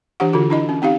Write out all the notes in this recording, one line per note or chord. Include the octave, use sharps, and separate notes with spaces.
E3 D4 G4 F#5
D3 F4 F#4
D4 E4 D#5
C#4
C4 D#4 G4 F5